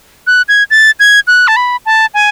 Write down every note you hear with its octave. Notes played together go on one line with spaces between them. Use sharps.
F#6
G#6
A6
G#6
F#6
A5
B5
A5
G#5